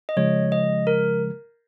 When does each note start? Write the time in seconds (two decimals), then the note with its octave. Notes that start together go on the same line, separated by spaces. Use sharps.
0.09 D#5
0.17 C#3 F3 G#3 C#5
0.52 D#5
0.87 A#4